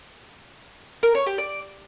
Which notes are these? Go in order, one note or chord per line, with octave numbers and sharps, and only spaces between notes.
A#4
C#5
G4
D5